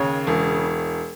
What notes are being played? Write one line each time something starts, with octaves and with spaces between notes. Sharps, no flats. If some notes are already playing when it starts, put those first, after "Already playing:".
Already playing: D#2 C#3 C#5
E1